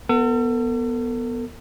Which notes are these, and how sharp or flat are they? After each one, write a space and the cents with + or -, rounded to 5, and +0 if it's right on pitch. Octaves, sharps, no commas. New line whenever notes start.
B3 -5 A4 +40